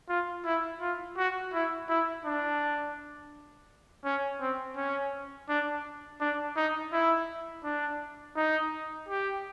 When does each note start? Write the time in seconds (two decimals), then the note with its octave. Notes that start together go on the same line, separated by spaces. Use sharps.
0.09 F4
0.45 E4
0.81 F4
1.17 F#4
1.53 E4
1.89 E4
2.25 D4
4.05 C#4
4.41 C4
4.76 C#4
5.49 D4
6.20 D4
6.56 D#4
6.92 E4
7.64 D4
8.37 D#4
9.08 G4